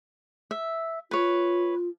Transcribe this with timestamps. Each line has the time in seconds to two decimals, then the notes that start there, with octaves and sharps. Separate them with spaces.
0.51 E5
1.11 F4 B4 C#5